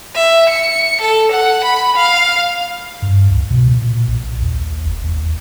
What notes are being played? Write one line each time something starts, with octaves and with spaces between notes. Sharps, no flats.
E5
C#7
A4
F#5
B5
F5
G2
C#2
B2
A#2
A#1
D#2
F#1
D#2